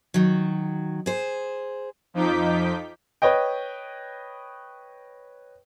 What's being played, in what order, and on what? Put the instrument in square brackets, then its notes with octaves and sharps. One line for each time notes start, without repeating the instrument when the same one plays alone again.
[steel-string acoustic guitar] D#3 F#3
G#4 C5
[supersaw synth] F2 F3 D#4 D6 G6 B6
[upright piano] B4 C#5 D#5 G5